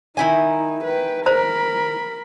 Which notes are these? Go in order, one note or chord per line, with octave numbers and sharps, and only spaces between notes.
D#3 D#4 E4 G#5
B4 G5
A#4 C5 A#5 B5